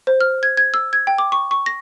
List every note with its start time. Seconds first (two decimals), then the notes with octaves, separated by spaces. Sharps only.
0.07 C5
0.21 F6
0.43 G#6
0.57 G#6
0.74 E6
0.93 G#6
1.07 G5
1.18 D6
1.32 C#6
1.51 C#6
1.66 A#6